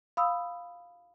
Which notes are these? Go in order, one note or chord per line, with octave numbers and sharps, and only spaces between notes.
F5 B5 D#6 E6